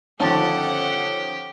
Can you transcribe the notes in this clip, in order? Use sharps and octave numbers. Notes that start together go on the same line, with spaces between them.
G1 D#3 F3 C#4 G4 A4 F#5 A5